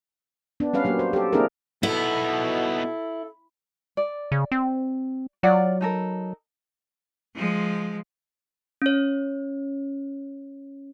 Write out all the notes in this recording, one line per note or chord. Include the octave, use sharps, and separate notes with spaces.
B3 D4
G3 C#4 B4 F5
F#3 A#3 G4
C5
G4 A4
A#3 C4 D4 E4 G#4 A#4
B2 B3 D#4 E4 A4
D5
C#3
C4
F#3 F4 D5 F#5
D#4 A4 A#4
F3 G#3
C#4 C#5